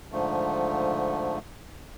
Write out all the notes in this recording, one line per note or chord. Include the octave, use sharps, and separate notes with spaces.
G#2 D3 F3 A3